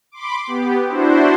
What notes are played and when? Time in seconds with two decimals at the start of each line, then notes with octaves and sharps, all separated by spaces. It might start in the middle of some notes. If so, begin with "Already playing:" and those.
0.12 B5 C6 D6
0.47 B3 G4
0.87 D4 E4 F#4 C5